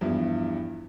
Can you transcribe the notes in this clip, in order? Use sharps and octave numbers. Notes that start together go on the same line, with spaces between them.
E2 G2 E3 F3 E4